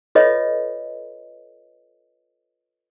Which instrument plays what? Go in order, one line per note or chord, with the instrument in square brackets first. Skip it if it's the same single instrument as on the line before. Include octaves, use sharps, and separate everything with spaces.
[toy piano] F4 A4 B4 C#5 D#5 E5